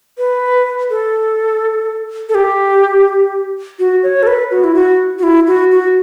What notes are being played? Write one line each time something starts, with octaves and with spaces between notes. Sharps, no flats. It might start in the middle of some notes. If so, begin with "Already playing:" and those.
B4
A4
A4
G4
F#4
C#5
A4
B4
F#4
E4
F#4
F#4
E4
F#4
F#4